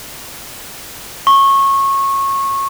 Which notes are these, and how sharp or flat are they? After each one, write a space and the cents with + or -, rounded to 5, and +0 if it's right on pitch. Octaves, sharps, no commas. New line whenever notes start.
C#6 -20